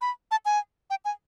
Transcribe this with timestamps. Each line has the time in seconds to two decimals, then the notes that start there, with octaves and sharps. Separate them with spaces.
0.01 B5
0.31 A5
0.45 G#5
0.90 G5
1.05 G#5